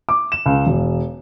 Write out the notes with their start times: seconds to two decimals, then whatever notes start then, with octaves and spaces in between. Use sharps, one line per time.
0.09 D6
0.32 E7
0.46 C#2
0.67 E1